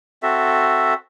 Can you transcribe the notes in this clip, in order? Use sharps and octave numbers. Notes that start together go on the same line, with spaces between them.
C4 F#4 A4 E5